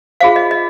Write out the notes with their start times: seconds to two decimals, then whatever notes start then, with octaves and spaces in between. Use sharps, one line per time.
0.20 F4 G#4 C5 F5
0.36 D#5
0.51 D#5